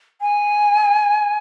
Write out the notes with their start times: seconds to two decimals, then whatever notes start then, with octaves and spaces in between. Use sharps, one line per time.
0.21 G#5